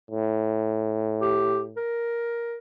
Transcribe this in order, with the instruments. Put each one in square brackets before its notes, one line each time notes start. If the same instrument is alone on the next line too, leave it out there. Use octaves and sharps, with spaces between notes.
[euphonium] A2
[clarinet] G4
A#4